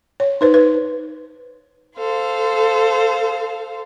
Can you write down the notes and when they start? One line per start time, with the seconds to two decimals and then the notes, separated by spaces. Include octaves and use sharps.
0.20 C#5
0.41 D#4 B4 C5
0.54 B4
1.97 A4 C5 F5